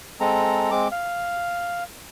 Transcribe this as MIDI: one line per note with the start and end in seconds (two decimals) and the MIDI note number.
0.20 0.71 56
0.20 0.71 60
0.20 0.71 69
0.20 0.71 82
0.71 0.88 56
0.71 0.88 60
0.71 0.88 86
0.92 1.84 77